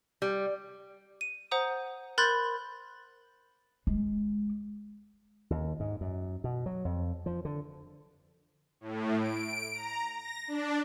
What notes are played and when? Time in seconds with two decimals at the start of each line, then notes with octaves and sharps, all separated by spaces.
0.22 G3
1.21 D#7
1.51 C5 F#5 A#5 D#6
2.18 A#4 B5 C6 F#6 G6 A6
3.87 G#3
5.50 D#2
5.80 G#2
6.01 F#2
6.44 B2
6.66 F#3
6.85 F2
7.26 F3
7.45 D3
8.81 A2
9.19 D7
9.72 A#5
10.14 A#6
10.48 D4